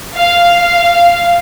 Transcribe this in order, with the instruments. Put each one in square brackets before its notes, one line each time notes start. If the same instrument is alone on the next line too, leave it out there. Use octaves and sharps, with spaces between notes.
[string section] F5